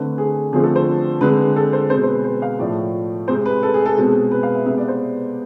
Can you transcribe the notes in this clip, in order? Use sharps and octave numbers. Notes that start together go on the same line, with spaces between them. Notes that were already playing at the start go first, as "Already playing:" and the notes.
Already playing: D3 A3 C4 B4
G#4
D3 F3 A3 C4 G#4
A4
C5
D3 G#3 C4 B4
A4
C5
B2 G#3 C4 C5
C5
B4
C5
F5
A2 F3 A3 D5
C3 G#3 C4 C5
B4
A4
G#4
A4
B2 G#3 C4
B4
F5
E5
C3 G#3 B3 E5
D5
C5